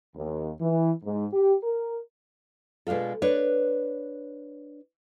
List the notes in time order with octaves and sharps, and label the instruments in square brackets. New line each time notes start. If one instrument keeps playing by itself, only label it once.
[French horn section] D#2
E3
G#2
G4
A#4
[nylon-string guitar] B2 G#3 D4 F4 A4
D4 B4 C#5